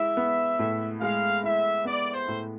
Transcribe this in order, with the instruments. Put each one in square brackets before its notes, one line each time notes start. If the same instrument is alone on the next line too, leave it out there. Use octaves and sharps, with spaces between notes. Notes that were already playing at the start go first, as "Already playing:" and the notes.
Already playing: [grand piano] G#3 E4 [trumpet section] E5
[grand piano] B3
A2
[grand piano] G#3 [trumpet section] F5
[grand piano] E4 [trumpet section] E5
[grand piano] B3 [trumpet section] D5
[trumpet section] C5
[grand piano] A2